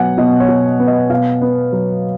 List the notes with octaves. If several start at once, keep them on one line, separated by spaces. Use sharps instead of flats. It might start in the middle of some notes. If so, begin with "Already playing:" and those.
Already playing: B2 F#3 B3 F#5 G#5
B2 D#5
C#5
B2
B3
D#5
B2 F5
B3
F#3